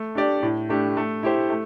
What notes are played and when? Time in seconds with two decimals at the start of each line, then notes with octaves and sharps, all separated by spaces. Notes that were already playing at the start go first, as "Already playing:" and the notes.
Already playing: A3
0.15 D4 G4 D5
0.43 A2
0.69 A3 D4 G4
0.97 A3
1.23 E4 G4 C5
1.50 A3